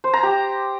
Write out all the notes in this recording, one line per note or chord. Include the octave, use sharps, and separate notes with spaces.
C5
A#5
G4